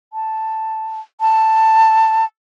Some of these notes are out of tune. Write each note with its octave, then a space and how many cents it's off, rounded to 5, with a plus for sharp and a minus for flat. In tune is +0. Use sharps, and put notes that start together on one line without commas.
A5 +0
A5 +10